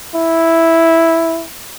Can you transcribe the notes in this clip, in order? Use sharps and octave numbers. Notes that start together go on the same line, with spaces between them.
E4